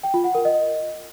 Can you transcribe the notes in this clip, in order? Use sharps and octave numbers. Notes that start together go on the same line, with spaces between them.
G5
F4
F#5
A#4
D#5